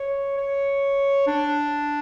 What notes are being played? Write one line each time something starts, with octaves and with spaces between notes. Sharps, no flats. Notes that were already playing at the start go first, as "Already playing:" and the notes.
Already playing: C#5
C#5
D4